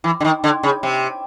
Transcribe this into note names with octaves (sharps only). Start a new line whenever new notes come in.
E3
D3
D#3
D3
C#3
C3